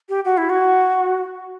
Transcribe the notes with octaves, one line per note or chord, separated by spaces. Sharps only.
G4
F#4
E4
F#4